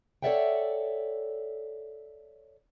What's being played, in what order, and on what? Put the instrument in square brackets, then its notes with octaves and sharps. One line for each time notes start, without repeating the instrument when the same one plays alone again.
[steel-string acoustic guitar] A4 C#5 D5 E5 F#5 G5